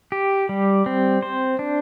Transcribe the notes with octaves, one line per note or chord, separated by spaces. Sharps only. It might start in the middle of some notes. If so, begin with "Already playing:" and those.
G4
G3
C4
C5
D4